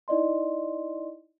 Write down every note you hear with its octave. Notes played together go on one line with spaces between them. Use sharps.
D#4 E4 D5 D#5 C6